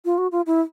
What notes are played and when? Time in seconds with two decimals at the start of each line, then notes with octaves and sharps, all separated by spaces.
0.05 F4
0.18 F#4
0.32 F4
0.46 E4